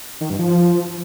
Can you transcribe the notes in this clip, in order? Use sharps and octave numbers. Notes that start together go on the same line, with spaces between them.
D#3
G2
F3